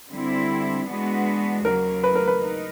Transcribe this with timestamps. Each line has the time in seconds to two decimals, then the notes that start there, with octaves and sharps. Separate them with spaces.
0.10 D3 G3 C4 E4
0.87 E3 G#3 B3 D4 F#4
1.64 D#2 C#3 F#3 A#3 A#4
2.04 B4
2.15 A#4
2.28 B4
2.41 D#4